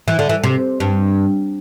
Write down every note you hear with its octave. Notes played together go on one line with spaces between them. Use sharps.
E3
D3
E3
C3
G2